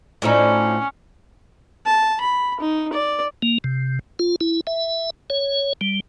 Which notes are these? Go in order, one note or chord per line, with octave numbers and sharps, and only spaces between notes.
A2 F3 C#4 D#4 D5
A5
B5
D#4
D5
A#3
C3
F4
E4
E5
C#5
G3